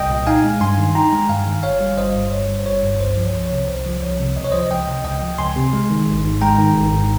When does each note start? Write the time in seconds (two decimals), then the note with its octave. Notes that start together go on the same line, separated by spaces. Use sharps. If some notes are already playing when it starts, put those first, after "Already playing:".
Already playing: C2 D#5 G5
0.10 A#2
0.27 D#4 F5 G#5
0.44 G#3
0.61 G2 G#5 C6
0.78 D#3
0.95 D#4 G5 A#5
1.12 G#3
1.29 G2 F5 G#5
1.47 D#3
1.63 G1 C#5 F5
1.81 G3
1.98 G1 C5 D#5
2.15 G2
2.31 G1 C#5
2.48 G3
2.59 C5
2.65 G1 C#5
2.83 G2
3.00 C2 C5
3.17 F3
3.23 C#5
3.34 C2
3.45 C#5
3.51 C3
3.68 C2 C5
3.86 F3
4.02 C2 C#5
4.19 C3
4.36 C#2 D#5
4.44 C#5
4.52 F3 C5 D#5
4.71 C#2 D#5 G5
4.88 C3
5.05 C#2 D#5 G5
5.21 F3
5.38 C#2 G#5 C6
5.56 C3
5.73 G#3
5.90 D#3
6.07 G#1
6.24 G#2
6.42 G#3 G5 A#5
6.58 D#3
6.75 G#1
6.93 G#2